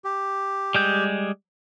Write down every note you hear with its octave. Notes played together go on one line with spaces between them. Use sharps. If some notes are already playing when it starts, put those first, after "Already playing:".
G4
G3 G#3 G6